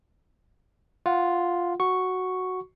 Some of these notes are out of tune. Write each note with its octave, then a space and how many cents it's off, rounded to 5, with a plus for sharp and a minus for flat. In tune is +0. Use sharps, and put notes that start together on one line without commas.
F4 +0 F#5 -5
F#4 +0 C#6 +0